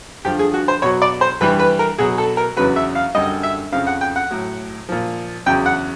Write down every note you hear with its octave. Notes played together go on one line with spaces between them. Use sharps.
G2 D3 F3 G4
G#4
F#4
C5
B2 F#3 C#5
D5
C5
G2 E3 G3 B4
B4
A#4
B2 F#3 G#4
A4
A#4
E2 C#3 F#3 B4
E5
F5
F#2 D3 G3 D#5
E5
F2 C#3 F3 F5
F#5
G5
F#5
A2 F#3
A#2 F3
E2 C#3 F#3 G5
F#5